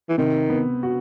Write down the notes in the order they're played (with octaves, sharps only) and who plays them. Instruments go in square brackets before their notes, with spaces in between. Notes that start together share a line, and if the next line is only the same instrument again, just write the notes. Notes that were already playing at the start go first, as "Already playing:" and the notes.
[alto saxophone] E3
[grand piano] C3 [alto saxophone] D#3
[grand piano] B3
F#4